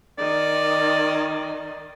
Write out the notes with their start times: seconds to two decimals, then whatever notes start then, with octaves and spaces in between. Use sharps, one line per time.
0.18 D#3 D5 D#5